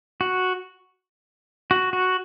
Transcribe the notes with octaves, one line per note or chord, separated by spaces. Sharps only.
F#4
F#4
F#4